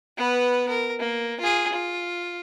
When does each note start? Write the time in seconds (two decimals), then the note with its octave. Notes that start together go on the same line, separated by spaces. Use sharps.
0.18 B3 B4
0.69 A#4
0.99 A#3
1.40 F4 G#4
1.72 F4